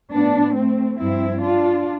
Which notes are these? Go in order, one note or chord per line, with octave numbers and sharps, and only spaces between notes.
A2 F3 B3 D4
A3 C4
G2 F3 C4 E4
D4 F4